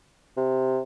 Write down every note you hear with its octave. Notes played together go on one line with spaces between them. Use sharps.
C3